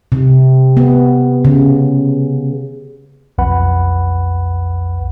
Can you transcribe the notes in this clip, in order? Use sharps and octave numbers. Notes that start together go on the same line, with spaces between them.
C3
B3
C#3
B1 F2 B4 F#5 B5